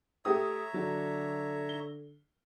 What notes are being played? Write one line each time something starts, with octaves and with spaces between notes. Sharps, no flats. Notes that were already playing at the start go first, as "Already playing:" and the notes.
A3 G4 C#5 E5 A#5 D#6
D3 F#3
G7